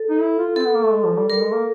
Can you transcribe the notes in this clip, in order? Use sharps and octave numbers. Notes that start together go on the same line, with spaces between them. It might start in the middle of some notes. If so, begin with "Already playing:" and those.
Already playing: A4
D#4
E4
F4
C4 A4
B3
A#3
A3
G#3
F3
G3
G3 A#4
G#3
A#3